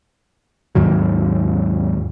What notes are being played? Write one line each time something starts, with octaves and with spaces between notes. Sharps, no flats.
D#2 G#2 D#3 F#3